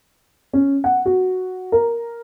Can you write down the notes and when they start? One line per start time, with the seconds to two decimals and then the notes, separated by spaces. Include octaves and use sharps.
0.53 C#4
0.84 F#5
1.06 F#4
1.72 A#4